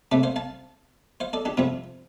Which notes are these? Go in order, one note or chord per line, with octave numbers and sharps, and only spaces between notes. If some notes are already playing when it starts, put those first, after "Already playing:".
C2 C3 A3 A4 D5
C5 F5
F5 A5
C5 F5
A4 D5
D4 G4
F2 C3 G3 C4 F4